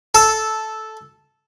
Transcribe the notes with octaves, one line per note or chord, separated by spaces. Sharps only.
A4